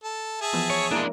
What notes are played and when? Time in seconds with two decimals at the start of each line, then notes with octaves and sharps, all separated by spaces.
0.03 A4
0.41 G#4 E5 A5
0.53 E3 F3 B3
0.70 C#5
0.91 G#3 A#3 D4 E4 A#4